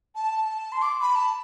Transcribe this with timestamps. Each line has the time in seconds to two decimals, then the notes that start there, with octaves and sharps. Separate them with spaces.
0.15 A5
0.44 A5
0.72 C6
0.82 D6
1.01 B5
1.15 A5